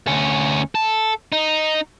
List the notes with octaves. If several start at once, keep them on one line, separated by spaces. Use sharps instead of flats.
D2 C#4
A4
D#4